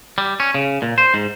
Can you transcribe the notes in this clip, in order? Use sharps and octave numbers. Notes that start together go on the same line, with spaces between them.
G3
C#4
C#3
A#2
C5
G#2